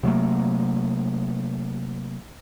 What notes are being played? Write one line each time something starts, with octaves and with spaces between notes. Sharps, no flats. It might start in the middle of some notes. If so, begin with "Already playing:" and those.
C3 F#3 A3 A#3